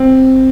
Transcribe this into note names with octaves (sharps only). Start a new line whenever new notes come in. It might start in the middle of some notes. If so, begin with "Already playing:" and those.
Already playing: C4